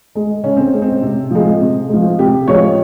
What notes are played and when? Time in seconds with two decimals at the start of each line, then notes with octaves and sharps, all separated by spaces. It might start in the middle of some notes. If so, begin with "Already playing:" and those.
0.15 G#3
0.44 C#3 C#4
0.57 C4
0.73 G#3
0.82 C4
1.02 C3
1.31 F3 G#3
1.60 C3
1.89 F3 G#3
2.18 C3 G4
2.48 F3 G#3 C#5